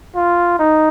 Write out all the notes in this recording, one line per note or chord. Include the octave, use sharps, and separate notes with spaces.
F4
D#4